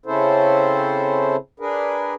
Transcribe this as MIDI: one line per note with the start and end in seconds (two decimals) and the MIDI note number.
0.06 1.36 49
0.06 1.36 60
0.06 1.36 61
0.06 1.36 64
0.06 1.36 69
0.06 1.36 72
1.60 2.14 62
1.60 2.14 68
1.60 2.14 70
1.60 2.14 71